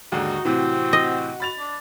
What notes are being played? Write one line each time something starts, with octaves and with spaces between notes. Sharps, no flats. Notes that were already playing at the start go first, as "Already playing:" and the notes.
D#2 G#2 D3 D#4 F#4
A2 C3 E3 C4
D#5
B5 A6 F7
D4